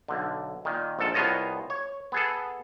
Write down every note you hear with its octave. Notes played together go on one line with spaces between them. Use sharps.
B1 D3
A#2 D#3
A#1 G#2 A4 A5
C2 B3 F4 C#5 D#5 A5
C#5
B3 G#4 A4